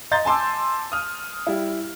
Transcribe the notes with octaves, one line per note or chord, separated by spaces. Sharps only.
D#5 A#5 C6 G6 A6
G#5 A5 C6 D6 E6
D#6 F6
G3 E4